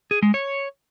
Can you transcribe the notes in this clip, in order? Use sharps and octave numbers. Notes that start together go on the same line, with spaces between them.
G#4
G#3
C#5